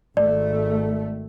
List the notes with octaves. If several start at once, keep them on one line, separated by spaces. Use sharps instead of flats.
G#1 A3 D5